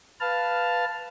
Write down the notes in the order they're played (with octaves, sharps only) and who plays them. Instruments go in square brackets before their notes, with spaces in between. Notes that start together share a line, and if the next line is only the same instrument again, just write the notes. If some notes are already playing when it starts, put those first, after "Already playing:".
[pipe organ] B4 F5 A5 F6